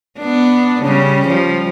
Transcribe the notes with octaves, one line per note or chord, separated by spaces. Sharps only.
B3 D4
C#3 G3 C#4
F3 G3